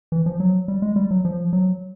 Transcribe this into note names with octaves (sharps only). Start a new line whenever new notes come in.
E3
F3
F#3
G3
G#3
G3
F#3
F3
F#3